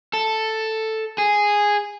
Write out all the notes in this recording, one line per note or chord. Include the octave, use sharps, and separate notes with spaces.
A4
G#4